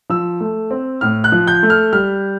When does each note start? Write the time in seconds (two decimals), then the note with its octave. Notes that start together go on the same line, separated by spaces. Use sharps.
0.10 F3 E6
0.41 A3
0.71 C4
1.01 A2 F6
1.24 F#6
1.32 F3
1.47 G6
1.63 A3
1.70 F6
1.93 G3 F6